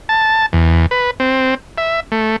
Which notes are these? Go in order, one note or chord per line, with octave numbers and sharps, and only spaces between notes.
A5
E2
B4
C4
E5
A3